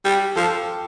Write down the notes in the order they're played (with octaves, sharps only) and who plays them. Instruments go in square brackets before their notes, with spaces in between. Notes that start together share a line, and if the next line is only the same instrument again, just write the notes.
[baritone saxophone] G3 [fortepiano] G4
[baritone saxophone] F3 [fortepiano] A4